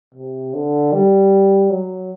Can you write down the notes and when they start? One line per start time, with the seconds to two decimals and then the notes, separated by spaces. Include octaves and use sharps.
0.14 C3
0.53 D3
0.93 G3
1.70 F#3